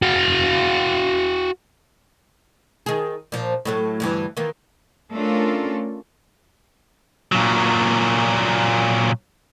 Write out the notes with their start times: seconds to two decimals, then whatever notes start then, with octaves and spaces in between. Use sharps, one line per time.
0.02 F#4 F5
2.86 D#3 G#4
3.32 A#2 F3
3.65 A2 F#3 A3
4.00 D2 G2 E3
4.37 D#3 E3 A#3
5.14 A3 C#4 D4 F4 A4 A#4
7.32 A#2 F#3